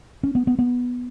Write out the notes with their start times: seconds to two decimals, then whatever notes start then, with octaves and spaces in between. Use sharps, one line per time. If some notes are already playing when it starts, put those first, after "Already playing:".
0.23 C#4
0.35 B3
0.47 B3
0.59 B3